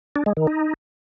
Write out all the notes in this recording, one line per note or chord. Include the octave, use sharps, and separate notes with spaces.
D4
G#3
D#3
D#4